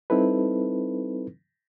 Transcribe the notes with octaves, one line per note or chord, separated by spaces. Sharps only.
G3 C4 D#4 E4 A4 B4